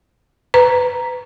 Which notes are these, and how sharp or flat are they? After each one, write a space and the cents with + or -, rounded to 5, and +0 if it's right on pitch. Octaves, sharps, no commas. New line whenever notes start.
B4 +15 A#5 +0